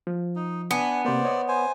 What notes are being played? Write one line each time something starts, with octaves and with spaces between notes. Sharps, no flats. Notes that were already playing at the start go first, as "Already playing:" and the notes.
F3
D#4
B3 D4 G#5
C3 A#3 C5 D5
C#5 D#5
C5 G#5